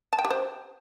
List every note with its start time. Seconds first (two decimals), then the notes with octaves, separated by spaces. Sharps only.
0.13 A5
0.19 G5
0.25 G4
0.30 C5